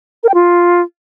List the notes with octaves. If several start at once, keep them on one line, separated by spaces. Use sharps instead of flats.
A#4
G5
F4